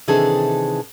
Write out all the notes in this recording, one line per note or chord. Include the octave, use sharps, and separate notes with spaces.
C3 D#3 E3 D4 G#4 A4